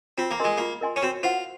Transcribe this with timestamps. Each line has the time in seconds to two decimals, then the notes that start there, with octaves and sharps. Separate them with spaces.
0.18 C4 F4
0.31 A#3
0.40 G#3 A#4 D#5 G#5 C6
0.58 A#3 F4
0.81 A#4 D#5 G#5 C6
0.96 C#4
1.02 C4 F#4
1.23 F4 C5 F#5